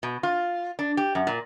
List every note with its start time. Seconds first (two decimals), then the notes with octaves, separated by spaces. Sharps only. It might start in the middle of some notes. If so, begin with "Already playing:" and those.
0.03 B2
0.23 F4
0.79 D4
0.97 G4
1.15 F#2
1.27 A#2